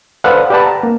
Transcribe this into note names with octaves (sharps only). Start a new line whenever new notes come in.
A4 B4 C5 D5 F5 F#5
G4 B4 D5 F#5 A5 B5
A#5
A#3